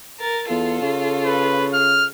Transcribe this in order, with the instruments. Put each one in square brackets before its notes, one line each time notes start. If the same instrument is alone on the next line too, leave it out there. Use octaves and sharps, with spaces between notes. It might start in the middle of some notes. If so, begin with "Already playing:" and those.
[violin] A#4 A6
[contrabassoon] E2 [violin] F4 A4
[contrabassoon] C#3
[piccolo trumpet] B4
F6